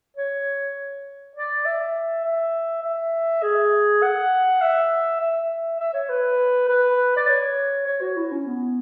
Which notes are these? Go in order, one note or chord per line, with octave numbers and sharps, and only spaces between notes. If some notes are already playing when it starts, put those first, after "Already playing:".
C#5
D5
E5
E5
E5
G#4
F#5
E5
E5
E5
C#5
B4
B4
D5
C#5
C#5
F#4
E4
C#4
B3